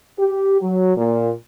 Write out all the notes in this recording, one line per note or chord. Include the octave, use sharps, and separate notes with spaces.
G4
F#3
A#2